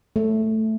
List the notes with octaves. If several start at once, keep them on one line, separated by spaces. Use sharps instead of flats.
A3